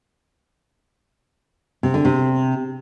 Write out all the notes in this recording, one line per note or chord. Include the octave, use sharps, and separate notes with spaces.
C3
D3
C3